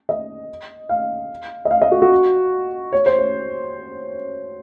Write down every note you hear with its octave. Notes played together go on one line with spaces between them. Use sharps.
D#5
F5
D#5
F5
D#5
F#4
F#4
C#5
C5
C#5